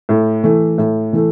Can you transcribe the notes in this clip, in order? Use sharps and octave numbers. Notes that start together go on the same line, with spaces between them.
A2
E3 A3
A2
E3 A3